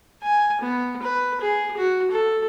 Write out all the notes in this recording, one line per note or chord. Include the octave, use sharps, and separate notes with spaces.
G#5
B3
B4
G#4
F#4
A4